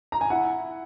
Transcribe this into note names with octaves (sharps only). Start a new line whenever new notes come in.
A#5
G#5
E4 F#5